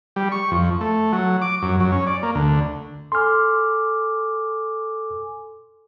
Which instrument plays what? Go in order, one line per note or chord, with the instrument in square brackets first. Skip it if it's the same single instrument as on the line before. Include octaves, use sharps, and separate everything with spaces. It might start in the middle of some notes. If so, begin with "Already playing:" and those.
[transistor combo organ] G3
C#6
F2
A3
F#3
D6
F#2
F#2
C#4
D5
A#3
D2
[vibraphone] A4 G#5 D6 [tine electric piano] C6 F6